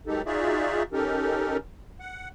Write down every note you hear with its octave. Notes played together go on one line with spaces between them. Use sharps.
D#3 F#3 G#3 D#4 G4 A4
D#4 F4 F#4 G#4 D5 E5
C#4 D#4 G4 A4 A#4
F#5